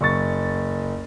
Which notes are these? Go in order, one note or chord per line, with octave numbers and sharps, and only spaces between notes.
F#1 C#6 A6